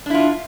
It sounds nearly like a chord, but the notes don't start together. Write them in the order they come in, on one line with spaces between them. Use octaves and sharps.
D4 E4 F4